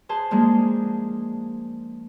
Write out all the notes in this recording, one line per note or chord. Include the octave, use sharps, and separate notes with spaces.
G#4 C5 A5
F3 G#3 A#3 D4 G#4